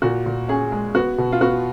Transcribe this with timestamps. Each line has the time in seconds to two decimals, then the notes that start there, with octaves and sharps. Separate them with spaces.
0.02 A#2 F#4
0.26 A#2
0.49 C#4 G#4
0.72 G#3
0.95 B3 F#4
1.18 B2
1.32 F4
1.41 B3 F#4